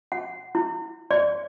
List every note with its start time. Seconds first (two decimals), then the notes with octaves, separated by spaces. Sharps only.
0.12 F#5
0.55 E4
1.11 D5